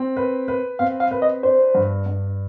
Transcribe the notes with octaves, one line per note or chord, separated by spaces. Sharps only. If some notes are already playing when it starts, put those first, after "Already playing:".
Already playing: C4
B4
B4
C4 F5
F5
B4
D#5
D4 C5
G2
G2